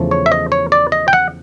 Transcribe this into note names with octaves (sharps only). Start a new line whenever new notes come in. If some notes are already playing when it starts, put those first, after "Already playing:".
Already playing: E2 C#3 F3 A3
C#5
E5
D#5
C#5
D5
D#5
G5
F#5